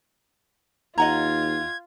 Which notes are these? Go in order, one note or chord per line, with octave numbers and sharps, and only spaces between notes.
D#2 F4 D#5 F#5 A#5 G#6